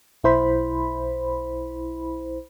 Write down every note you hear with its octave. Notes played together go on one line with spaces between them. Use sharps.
B1 E4 C5 B5